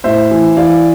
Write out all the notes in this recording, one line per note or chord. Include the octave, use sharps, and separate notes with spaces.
A2 C5 E5
E3
E3 D5 F5